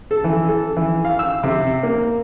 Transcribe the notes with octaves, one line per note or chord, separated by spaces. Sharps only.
A4
E3
A4
E3
F5
E6
C3
A#3